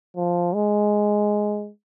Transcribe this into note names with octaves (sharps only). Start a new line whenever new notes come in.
F3
G#3